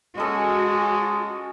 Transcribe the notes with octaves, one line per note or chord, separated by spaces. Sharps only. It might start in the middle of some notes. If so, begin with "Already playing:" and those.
G#3 C#4 F#4 A4 D#5